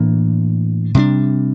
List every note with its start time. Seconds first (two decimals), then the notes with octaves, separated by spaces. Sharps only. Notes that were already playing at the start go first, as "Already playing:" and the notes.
Already playing: A2 E3 A#3 D4
0.94 C3 G3 A#3 D4